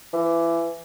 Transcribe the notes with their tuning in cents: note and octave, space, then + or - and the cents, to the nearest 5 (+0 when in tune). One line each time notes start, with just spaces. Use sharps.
E3 +25